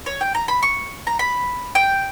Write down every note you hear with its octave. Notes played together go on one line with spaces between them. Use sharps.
C#5
G5
A#5
B5
C#6
A#5
B5
G5